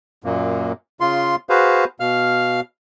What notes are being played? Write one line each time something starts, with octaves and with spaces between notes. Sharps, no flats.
F#2 A#2 A#3
C#3 F4 C6
F#4 G#4 B4 C5 F5
B2 F5 F6